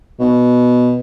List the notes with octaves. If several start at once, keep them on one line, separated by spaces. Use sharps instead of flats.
B2